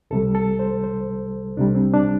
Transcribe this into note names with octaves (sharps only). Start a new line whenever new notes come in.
C2 C3 G3 A4
A4
C5
C5
C2 C3 G3 D4
C4
D4